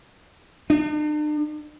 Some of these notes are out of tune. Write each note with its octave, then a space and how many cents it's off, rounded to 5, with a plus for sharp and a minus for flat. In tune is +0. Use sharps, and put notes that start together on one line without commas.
D4 +45